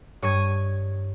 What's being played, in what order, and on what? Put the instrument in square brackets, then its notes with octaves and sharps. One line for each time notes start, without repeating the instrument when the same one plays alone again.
[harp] G2 C#5 D#6 G#6 D#7